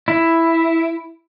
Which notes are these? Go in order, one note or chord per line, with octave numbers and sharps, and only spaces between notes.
E4